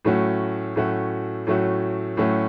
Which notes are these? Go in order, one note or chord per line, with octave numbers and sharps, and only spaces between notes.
A2 F#3 A3 C#4 F#4
A2 F#3 A3 C#4 F#4
A2 F#3 A3 C#4 F#4
A2 F#3 A3 C#4 F#4